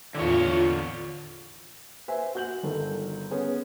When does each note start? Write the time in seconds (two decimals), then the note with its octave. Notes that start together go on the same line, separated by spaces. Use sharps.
0.15 E2 A2 D3 F4 C#5
2.08 B4 C5 E5 G#5
2.35 F#4 G6 F#7
2.63 G1 D#3 A4
3.31 B3 C#4 G#4